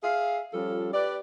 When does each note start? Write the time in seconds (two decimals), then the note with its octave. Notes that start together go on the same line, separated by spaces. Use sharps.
0.03 G#4 E5 F5
0.53 F3 G3 C#4 F4 A4
0.93 G4 B4 D5